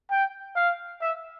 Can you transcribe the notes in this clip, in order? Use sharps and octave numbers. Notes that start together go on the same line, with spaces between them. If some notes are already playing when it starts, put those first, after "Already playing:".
G5
F5
E5